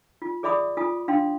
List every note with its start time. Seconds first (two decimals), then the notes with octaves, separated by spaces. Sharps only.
0.22 F4
0.43 G#4 D5 E5 B5 D6 D#6
0.77 F4 G#5 D#6
1.08 D4 F5 G5 C6